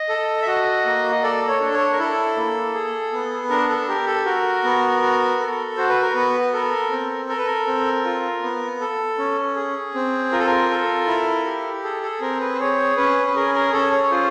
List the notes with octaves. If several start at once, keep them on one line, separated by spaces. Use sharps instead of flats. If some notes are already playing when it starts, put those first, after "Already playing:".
Already playing: D#5
A4
E5
F#4 D#5
A#3
D#5
A4 D5
C#5
D4
C#5
A#4
E4 A4
A#3
G#4
B3
D4 A#4
A4
G4 A#4
A4
F#4 A#4
B3
F#4
A4
F#4 C5
B4
A#4
B3 B4
A4 A#4
C4
A4 A#4
B4
A#4
C4
F4
B3
A4
C#4
G#4
C4
F4 A#4
A4
A#4
A4
E4
G4
G#4 A4
A4
C4 A#4
B4
C5
G#4 C#5
C#4 B4
B4
G#4 A#4
A#4
C#4 A4
C#5
C#5
F4 C5